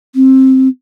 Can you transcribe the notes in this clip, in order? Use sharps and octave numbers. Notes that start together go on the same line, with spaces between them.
C4